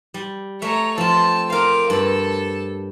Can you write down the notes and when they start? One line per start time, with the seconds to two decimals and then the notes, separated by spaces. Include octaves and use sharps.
0.14 G3
0.62 A3 C#5 E5 A#5
0.98 F3 C4 A5 E6
1.50 A#4 C5 F5 D6
1.90 G2 A4 E6